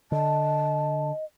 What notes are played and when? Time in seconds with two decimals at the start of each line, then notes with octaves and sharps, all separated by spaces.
0.12 D3 D#5 A5